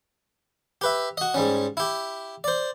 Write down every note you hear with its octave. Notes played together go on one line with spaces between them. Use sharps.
G4 B4 E5
F#4 D#5
G#2 G3 C#4
E4 G4
C5 D5